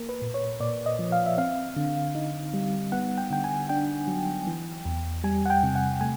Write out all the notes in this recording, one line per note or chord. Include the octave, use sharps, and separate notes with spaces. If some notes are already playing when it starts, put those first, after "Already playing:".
Already playing: A#3 A#4
B4
A#2
C#5
A#2 D5
D#5
F3
F5
E5
C4 F5
D3
D#4
G3
B3 F#5
G5
D3 G5
G#5
D4 G5
F#3
E3
E2
G3 G#5
F#5
G5
C3
F#5
A3 G#5